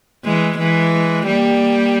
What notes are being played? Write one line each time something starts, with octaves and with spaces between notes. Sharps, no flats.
E3 G#3
E3 G#3
G3 A#3